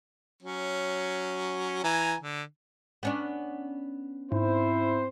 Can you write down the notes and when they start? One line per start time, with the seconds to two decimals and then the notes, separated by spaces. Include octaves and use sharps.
0.43 F#3 C#4
1.84 E3 G#5 A#5
2.21 D3
3.03 B3 C#4 D4
4.32 G#2 C4 E4 C5